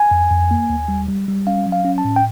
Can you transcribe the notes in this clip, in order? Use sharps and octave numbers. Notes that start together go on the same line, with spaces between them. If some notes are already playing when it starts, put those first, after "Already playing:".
Already playing: G#5
F2
F2
A#3
D#2
G3
G3
G3
C#4 F5
F#3
F5
C#4
A5
A2
G5